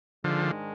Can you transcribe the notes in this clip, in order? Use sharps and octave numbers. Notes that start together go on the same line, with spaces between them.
G#2 D3 D#3 F3 G#3 D4